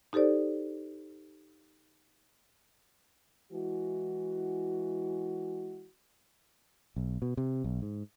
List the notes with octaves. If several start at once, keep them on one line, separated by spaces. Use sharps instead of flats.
D#4 G4 A4 C5 D5
E3 G#3 E4 F#4
B1
B2
C3
B1
G#2